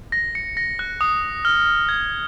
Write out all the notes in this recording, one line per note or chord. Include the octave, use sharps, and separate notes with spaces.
A#6
C#7
A#6
F#6
D#6
F6
G#6